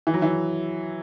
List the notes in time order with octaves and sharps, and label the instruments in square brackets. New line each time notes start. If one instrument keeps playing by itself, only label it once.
[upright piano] E3
F#3
E3